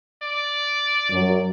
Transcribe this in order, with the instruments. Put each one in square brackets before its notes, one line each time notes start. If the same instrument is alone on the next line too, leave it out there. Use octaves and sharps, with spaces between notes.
[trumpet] D5
[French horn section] F#2 F#3